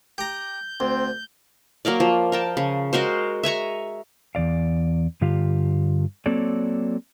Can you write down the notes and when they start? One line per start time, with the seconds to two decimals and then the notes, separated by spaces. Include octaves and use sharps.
0.18 G4 A#5 G6
0.80 D2 C4
1.85 F#3 A#3 A#4 D5
2.00 F3
2.32 A#4 G5 A5
2.57 C#3
2.93 G#3 F#4 A#4 C5
3.43 E5 G#5 A#5 C#6
4.35 E2 G#2 D5 F5
5.21 G2 D3 F4 G4 F5
6.26 F#3 A#3 C4 A4 C#5 D5